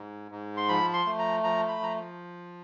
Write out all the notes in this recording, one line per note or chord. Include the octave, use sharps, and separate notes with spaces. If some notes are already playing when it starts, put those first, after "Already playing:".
Already playing: G#2
G#2
C6
F3 B5
C6
A3
A#5
F3 A#5
B5
F3 A#5